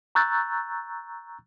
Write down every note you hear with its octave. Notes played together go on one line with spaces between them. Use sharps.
A#5 C#6 E6 F#6 G6 A6